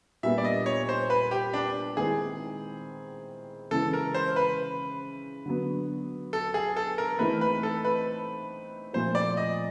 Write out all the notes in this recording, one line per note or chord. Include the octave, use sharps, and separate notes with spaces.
A#2 G3 B3 D4 E5
D5
D#5
C#5
C5
B4
G4
D4
D#3 G#3 C4 E4 G#4
C#3 E3 G#3 A4
A#4
C5
B4
D3 F#3 B3
A4
G#4
A4
A#4
E3 A3 C4 D#4 B4
B4
A4
B4
A#2 F3 A3 C4 C5
D5
D#5